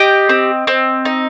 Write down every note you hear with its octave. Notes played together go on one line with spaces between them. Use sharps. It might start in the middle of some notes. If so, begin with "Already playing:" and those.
Already playing: G4 D#5 G5
C4
C4
D#4